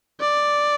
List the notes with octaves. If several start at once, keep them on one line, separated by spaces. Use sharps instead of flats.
D5